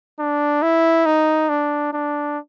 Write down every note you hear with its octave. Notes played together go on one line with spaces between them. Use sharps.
D4
E4
D#4
D4
D4